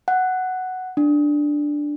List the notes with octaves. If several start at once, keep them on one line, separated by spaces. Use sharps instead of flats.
F#5
D4